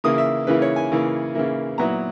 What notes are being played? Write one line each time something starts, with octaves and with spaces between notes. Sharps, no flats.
C#3 E3 A#3 E4 D#6
E5
C#3 E3 A#3 E4 B4
C#5
G#5
C#3 E3 A#3 E4
C#3 E3 A#3 E4
A#2 F#3 B3 E4 A#5